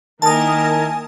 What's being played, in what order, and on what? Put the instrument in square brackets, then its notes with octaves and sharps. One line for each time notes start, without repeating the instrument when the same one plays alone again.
[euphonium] D#3 [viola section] A#3 E4 A#4 [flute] G#5 [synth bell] A5 D#6